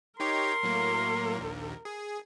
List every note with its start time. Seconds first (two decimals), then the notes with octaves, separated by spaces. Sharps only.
0.20 D#4 G4 A#4 C#5 C6
0.63 A2 F#3 A#3
1.38 A#1 D#2
1.85 G#4